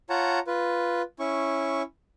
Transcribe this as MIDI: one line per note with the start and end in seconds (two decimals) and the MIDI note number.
0.10 0.39 65
0.10 0.39 73
0.10 0.39 78
0.10 0.39 81
0.10 0.39 82
0.47 1.02 65
0.47 1.02 71
1.19 1.82 61
1.19 1.82 64
1.19 1.82 85